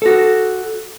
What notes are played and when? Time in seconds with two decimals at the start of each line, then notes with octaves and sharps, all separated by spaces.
0.02 F#4 A4